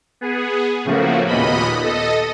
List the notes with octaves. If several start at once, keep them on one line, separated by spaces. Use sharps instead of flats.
B3 G#4
A2 C#3 F3 A3 A#3 F#4
D#2 A#2 B3 D#5 B5
A4 D#5